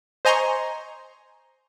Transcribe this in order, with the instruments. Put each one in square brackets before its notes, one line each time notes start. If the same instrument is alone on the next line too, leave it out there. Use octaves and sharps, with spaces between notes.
[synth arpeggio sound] C5 D#5 G#5 A#5 C6 C#6